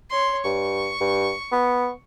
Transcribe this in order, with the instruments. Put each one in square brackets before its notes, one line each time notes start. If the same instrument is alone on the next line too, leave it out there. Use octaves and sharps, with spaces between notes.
[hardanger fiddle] C#5 C6
[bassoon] G2 [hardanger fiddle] C#6
[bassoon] G2
B3